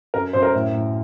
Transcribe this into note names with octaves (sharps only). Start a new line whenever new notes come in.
F#2 A#4
F#2 C5
A#4
A2
A2